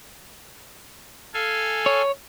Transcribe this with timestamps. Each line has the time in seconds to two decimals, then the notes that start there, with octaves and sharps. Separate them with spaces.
1.34 A4 F5 G#5
1.86 C#5